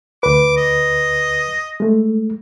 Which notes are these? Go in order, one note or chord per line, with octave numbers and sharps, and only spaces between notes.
D2 B4 D6
D#5
G#3 A3